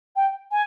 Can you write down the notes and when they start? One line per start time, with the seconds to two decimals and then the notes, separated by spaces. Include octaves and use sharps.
0.16 G5
0.51 G#5